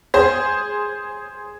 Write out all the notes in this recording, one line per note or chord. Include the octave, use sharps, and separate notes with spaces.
G#4 C5